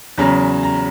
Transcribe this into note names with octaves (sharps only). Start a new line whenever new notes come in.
E2 C#3 F#3 A#5
A#5